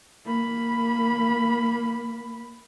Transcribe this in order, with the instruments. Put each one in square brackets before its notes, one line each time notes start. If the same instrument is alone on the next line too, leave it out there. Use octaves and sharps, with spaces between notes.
[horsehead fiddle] A#3 B5